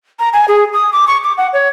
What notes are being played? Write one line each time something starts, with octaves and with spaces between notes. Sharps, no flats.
A#5
G#5
G#4
D#6
D6
C#6
D6
F#5
C#5